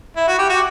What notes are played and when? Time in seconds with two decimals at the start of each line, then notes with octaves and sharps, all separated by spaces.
0.16 E4
0.28 F#4
0.38 G4
0.49 F#4